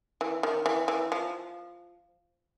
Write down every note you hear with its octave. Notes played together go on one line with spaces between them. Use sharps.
E3
D#3
E3
E3
F3